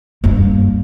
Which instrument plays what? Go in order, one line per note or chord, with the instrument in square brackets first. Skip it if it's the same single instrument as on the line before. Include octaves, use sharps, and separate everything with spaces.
[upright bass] G2 A#3